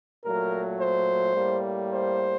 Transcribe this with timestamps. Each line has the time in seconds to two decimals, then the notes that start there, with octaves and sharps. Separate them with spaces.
0.25 A#2 F#3 A3 A#4
0.81 C5
1.36 A2 G3 A#3
1.91 C5